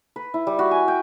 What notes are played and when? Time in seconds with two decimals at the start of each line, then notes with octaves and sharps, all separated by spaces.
0.16 B4
0.34 E4
0.47 G3
0.59 F#4
0.71 G#5
0.88 G5